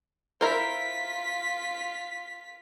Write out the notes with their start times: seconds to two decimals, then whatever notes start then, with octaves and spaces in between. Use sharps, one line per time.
0.41 E4 F4 A#4 C5 B6